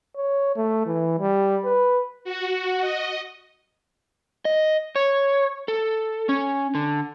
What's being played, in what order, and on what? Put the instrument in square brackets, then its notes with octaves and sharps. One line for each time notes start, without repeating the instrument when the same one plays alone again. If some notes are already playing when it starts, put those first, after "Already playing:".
[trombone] C#5
A3
E3
G3
B4
[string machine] F#4
D#5
[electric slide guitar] D#5
C#5
A4
C#4
D3